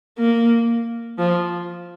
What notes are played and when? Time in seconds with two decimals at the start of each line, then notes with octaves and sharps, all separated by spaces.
0.19 A#3
1.18 F3